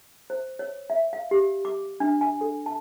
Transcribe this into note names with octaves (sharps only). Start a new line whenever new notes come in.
C5
C#5
E5
F5
G4
D6
D4
G#5
A4
A5